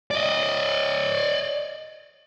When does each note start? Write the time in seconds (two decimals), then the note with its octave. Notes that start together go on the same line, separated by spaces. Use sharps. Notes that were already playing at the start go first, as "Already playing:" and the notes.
0.11 D5 D#5